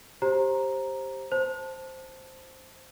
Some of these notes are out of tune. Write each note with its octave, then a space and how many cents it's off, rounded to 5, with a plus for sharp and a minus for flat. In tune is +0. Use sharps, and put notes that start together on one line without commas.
G4 +0 C5 +20 A#5 +0
C5 +0 A5 +0